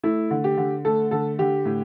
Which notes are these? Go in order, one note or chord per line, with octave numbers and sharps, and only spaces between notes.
A3 E4
D3
G4
D3
A3 A4
D3 A4
D3 G4
A2